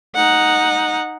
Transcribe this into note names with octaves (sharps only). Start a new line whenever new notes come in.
D#4 F#5